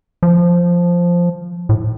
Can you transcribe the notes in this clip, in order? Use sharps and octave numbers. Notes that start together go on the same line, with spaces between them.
F3
A2